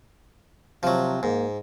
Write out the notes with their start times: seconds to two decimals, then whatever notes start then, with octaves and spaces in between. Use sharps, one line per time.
0.83 C3 F3 F#3
1.23 G#2 A#3